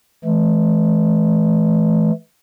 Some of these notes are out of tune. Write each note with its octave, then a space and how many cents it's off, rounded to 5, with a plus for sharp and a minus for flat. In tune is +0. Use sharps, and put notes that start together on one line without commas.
E3 +0 A3 -40